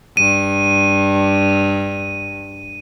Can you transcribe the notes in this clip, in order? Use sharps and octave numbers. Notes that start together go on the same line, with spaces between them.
G2 D#7